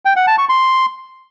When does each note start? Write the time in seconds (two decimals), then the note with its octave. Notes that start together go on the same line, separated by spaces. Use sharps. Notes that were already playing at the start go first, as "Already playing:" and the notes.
0.05 G5
0.16 F#5
0.27 A5
0.38 C#6
0.49 C6